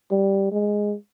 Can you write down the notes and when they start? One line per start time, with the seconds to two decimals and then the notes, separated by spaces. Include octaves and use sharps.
0.11 G3
0.52 G#3